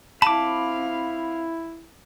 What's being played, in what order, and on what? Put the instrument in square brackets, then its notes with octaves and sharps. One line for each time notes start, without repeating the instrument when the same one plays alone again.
[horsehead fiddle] C4 F5 [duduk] E4 [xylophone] A5 [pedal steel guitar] B5 D6